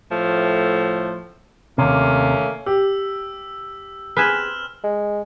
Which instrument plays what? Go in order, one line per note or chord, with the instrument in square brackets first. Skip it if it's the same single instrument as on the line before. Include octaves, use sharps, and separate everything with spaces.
[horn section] A2 F3 A3
[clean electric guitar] D#2 C3 [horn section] A3 A#3 C#4
[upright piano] G4 [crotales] E6
[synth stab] B3 G#4 G#5 [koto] C4 B4 [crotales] F6 E7 F#7
[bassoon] G#3